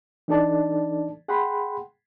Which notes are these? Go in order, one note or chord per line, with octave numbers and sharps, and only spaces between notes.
E3 D4 D#4 A4 D5 A5
G#4 F#5 G5 B5 C6